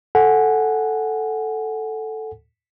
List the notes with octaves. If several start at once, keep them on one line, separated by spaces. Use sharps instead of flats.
A4 F#5 G#5